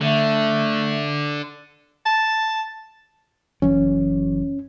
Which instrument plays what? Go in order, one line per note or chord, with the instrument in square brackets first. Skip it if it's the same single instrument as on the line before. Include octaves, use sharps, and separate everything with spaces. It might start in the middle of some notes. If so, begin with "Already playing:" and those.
[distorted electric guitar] D3 [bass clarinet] A3
[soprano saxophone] A5
[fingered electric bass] F#1 E3 F#3 [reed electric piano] C#4